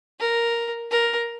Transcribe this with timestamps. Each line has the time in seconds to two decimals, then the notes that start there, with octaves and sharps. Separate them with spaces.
0.20 A#4
0.91 A#4